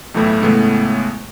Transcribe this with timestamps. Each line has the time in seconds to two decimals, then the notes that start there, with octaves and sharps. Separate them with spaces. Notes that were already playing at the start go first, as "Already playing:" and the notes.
0.14 B1 A2 E3 A3 E4
0.41 A2 C#3 E3 G#3 A3 B3